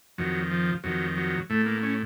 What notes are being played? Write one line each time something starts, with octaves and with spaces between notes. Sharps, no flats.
F2 D#3 F#3
F3
F2 D#3 F#3
F#3
A2 A3
A#3
C#4